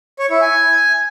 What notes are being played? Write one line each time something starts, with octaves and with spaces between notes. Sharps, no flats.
C#5
E4
G#5